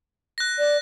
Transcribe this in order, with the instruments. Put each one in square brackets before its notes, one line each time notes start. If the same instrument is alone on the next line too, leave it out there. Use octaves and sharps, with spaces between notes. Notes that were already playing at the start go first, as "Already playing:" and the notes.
[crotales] F#6 A#6
[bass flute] D5